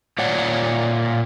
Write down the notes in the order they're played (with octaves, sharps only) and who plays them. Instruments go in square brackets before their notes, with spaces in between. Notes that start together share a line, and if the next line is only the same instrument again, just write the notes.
[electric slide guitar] A#2 C#5 D5 F#5